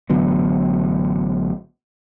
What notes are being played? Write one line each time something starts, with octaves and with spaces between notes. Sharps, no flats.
A1 D3 F#3 B3